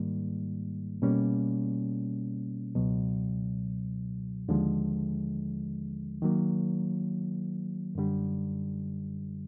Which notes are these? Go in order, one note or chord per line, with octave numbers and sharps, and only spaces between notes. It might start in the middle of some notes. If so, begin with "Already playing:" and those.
Already playing: G#2 D#3 G3 A#3
B2 G3 A#3 C#4
C#2 B2 F#3
D#2 D3 F3 G#3
D#3 F#3 A#3
F#2 D3 G3